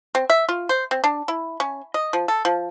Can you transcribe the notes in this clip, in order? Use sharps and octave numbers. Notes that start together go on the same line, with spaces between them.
C4
E5
F4
C5
C4
D4
E4
C#4
D#5
F3
A4
F3